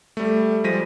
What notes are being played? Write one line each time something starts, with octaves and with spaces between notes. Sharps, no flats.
G3 A3
F3 G3 G#3 A#6 B6 D#7